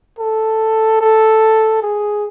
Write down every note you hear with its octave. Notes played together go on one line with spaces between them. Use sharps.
A4
A4
G#4